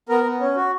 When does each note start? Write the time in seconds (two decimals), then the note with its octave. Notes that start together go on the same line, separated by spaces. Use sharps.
0.09 B3 A#4
0.24 B3
0.40 C#4
0.56 F#4